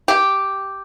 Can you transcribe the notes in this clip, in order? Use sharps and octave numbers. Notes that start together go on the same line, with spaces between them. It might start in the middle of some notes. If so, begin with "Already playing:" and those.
G4